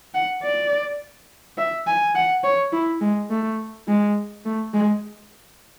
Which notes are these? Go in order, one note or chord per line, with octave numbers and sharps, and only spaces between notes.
F#5
D5
E5
G#5
F#5
C#5
E4
G#3
A3
G#3
A3
G#3